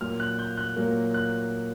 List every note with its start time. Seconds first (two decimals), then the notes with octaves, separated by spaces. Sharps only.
0.01 A#2 F#3 A#3 F6
0.20 F#6
0.39 G6
0.57 F#6
0.76 A#2 F#3 A#3
1.14 F#6